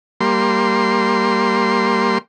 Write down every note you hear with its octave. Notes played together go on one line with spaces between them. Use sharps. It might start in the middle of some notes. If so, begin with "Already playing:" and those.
G3 A#3 C6